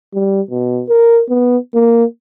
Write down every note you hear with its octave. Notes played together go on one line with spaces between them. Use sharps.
G3
B2
A#4
B3
A#3